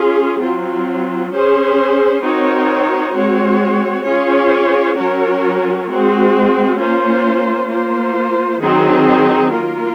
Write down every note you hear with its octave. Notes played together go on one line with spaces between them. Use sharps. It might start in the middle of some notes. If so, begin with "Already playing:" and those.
Already playing: C#4 F4 G#4
F#3 C4 F4
C#4 G#4 C5
C4 D#4 F#4 A#4 C#5
G#3 C4 F#4 C#5
C#4 F4 G#4 C#5
F#3 C#4 F#4 A#4 C#5
G#3 C4 F#4
A#3 C#4 F4 C5
A#3 F4 C5
D#3 F#3 C4 D#4 G#4
A#3 F4 A#4